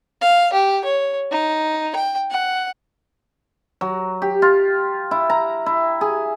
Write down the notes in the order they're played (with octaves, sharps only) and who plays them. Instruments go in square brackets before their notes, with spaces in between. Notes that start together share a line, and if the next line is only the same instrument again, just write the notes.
[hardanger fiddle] F5
G4
C#5
D#4
G5
F#5
[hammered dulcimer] F#3
G4
F4
E4
A#5
E4
G#4